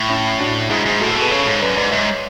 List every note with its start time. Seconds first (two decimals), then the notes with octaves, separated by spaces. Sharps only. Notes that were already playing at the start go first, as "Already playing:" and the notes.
Already playing: A2
0.09 C#4 E4
0.40 D4 F#4
0.70 G#2 E4 G#4
0.86 G#2
1.01 A2 F#4 A4
1.11 B2 F#4 A4
1.21 G#4 B4
1.31 C#3 A4 C#5
1.46 G#2
1.62 F#2 B4 D5
1.77 G#2 B4 D5
1.92 G#2 C#5 E5